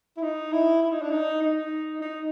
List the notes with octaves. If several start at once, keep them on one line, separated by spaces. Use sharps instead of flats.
E4
D#4
E4
E4
D#4
D4
D#4
D#4
D#4